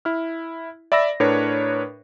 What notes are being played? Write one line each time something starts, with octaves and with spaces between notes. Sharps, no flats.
E4 F6
D5 E5 B5 E6 A#6
A2 D4 A#4 B4 C#5